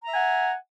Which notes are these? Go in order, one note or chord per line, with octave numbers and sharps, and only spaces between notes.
E5 F#5 G#5 A#5